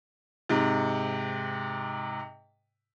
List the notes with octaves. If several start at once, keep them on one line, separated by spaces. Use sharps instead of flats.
G#2 C3